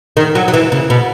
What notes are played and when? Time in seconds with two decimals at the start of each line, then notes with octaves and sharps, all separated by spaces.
0.17 D#3
0.35 F#3
0.48 F#3
0.54 E3
0.72 C#3
0.90 B2